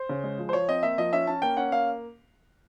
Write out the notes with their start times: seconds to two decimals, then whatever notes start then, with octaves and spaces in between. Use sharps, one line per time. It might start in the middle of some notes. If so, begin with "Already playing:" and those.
Already playing: C5
0.09 C#3
0.24 G#3
0.38 F3
0.49 C5
0.53 F3 C#5
0.68 C4 D#5
0.83 A#3 E5
0.98 F3 D#5
1.13 C#4 E5
1.27 C#4 A5
1.42 A#3 G5
1.57 C#4 F#5
1.72 A#3 F5